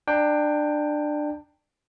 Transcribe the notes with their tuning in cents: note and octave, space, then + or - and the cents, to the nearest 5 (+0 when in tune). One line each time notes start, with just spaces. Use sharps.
D4 +20 G5 +15 A#5 +0